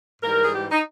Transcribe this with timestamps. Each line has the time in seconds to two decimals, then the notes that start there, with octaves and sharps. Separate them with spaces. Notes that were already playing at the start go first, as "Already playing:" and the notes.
0.22 G#2 E3 G3 A#4
0.43 G#4
0.52 G4
0.71 D#4